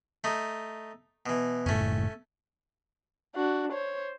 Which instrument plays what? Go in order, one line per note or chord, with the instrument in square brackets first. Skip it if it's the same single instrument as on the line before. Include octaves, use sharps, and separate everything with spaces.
[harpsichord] A3 D#4
B2 E3
[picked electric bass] F#1 A2 [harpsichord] A3 C#4
[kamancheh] D4 F#4
C5 C#5